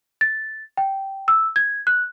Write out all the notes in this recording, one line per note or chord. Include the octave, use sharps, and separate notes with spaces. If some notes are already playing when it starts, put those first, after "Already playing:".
A6
G5
E6
G#6
F#6